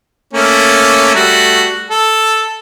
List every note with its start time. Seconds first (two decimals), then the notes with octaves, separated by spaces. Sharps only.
0.33 A3 A#3 C#4
1.15 G3 A3 F#4
1.90 A4